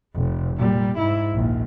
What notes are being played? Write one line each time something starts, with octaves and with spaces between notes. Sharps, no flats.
F1
A#2 G3
G#2 E4
A#1 D#2